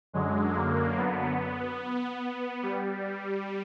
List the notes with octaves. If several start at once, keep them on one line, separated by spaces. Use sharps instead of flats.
F#2 D3 F#3 G#3
A#3
B3
G3